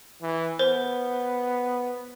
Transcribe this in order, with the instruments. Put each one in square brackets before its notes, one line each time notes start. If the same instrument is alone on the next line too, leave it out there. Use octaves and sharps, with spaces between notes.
[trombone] E3
[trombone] B3 [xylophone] A#4 C5